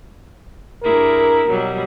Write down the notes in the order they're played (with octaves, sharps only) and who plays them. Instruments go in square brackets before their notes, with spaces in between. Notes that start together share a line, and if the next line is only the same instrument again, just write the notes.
[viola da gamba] G2 E4 G#4 [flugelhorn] A#4
[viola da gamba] B2 F#3 G3